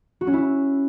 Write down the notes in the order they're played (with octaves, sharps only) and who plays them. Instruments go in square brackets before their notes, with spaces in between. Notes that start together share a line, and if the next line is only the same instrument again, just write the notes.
[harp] F#4
C#4
E4